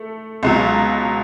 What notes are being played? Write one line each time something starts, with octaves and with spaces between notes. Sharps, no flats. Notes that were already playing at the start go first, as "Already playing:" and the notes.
Already playing: A3
C#2 B2 F#3